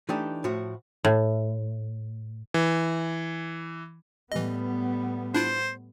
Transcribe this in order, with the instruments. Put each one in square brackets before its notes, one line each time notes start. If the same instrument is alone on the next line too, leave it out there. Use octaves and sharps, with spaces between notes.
[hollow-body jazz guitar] E3 A3 D4 D#4 G4
A2 F3 F#4
[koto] A2
[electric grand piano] E3
[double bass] A2 G3 [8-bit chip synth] E3 D#5 [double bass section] B3
[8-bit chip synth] D4 E4 F4 [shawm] C5